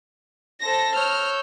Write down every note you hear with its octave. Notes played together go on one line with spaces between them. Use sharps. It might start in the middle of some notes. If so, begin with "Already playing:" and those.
A4 C5 A#6
C#5 E6 F6 G6